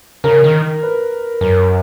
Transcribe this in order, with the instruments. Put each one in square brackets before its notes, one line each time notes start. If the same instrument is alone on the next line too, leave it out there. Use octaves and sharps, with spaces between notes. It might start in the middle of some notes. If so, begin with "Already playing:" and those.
[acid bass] C#3 [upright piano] A#4
[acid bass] D#3
[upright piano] B4
[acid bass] F#2 [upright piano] A#4